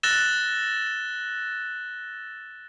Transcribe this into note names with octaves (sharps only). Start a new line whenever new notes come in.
E6 F#6 A6 A#6 E7 G7